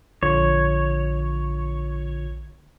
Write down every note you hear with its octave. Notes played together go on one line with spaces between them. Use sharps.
A#1 D3 F4 C#5